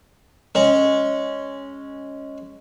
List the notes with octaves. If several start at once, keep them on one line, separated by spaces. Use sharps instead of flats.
G#3 C#4